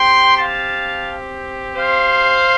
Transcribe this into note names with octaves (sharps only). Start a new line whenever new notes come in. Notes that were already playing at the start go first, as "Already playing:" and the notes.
Already playing: C4 G4 G5 C6
F5 A5
C5 F5